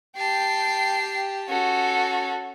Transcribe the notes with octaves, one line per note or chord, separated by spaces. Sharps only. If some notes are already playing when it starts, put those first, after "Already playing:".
G4 G5 A5 C7
C#4 F#4 A4